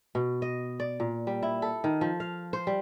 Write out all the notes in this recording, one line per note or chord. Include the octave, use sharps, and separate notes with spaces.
B2
D#5
D5
A#2
G3
E4
A4
D#3
F3
F5
C5
G3